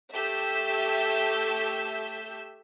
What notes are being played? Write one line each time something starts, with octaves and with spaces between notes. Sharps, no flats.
A3 G4 E5 E6 G6